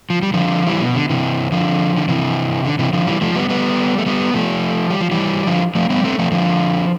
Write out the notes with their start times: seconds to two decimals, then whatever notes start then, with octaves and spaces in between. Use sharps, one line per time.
0.10 F3
0.22 G3
0.34 D3 F3
0.67 E3 G3
0.81 B2
0.95 D3
1.09 C3 E3
1.52 D3 F3
1.96 D3
2.08 C3 E3
2.65 D3
2.79 C3 E3
2.93 D3 F3
3.07 E3 G3
3.21 F3 A3
3.35 G3 B3
3.49 G3 B3
3.98 A3
4.06 G3 B3
4.34 F3 A3
4.90 G3
5.01 F3
5.11 E3 G3
5.47 D3 F3
5.75 F3 A3
5.90 G3 B3
6.04 A3 C4
6.19 F3 A3
6.31 D3 F3